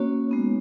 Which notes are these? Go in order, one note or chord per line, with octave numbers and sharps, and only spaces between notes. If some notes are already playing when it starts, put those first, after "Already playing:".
Already playing: A#3 C#4 F#4 C#5
G#3 B3 D#4